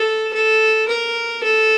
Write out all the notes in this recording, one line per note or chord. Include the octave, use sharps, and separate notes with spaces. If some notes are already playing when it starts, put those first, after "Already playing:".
Already playing: A4
A4
A#4
A4